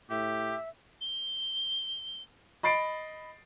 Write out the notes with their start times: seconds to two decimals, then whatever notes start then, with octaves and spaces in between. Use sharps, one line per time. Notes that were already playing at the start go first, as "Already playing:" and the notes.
0.10 A2 G4 E5
1.01 G7
2.63 D#5 B5 A6 C7 D7